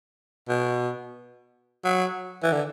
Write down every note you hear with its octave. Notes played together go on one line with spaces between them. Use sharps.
B2
F#3
E3
D3